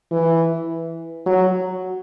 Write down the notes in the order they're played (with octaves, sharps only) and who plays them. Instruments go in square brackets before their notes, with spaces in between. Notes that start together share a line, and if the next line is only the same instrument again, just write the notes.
[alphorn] E3
F#3